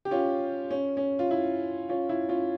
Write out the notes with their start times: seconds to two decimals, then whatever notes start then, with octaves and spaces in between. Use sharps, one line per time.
0.05 G4
0.11 C#4 F4
0.71 C#4
0.97 C#4
1.19 F4
1.31 E4
1.89 C#4 F4
2.09 E4
2.29 C#4 F4